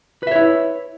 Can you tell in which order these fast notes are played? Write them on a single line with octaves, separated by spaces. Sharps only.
B4 E5 C#5 E4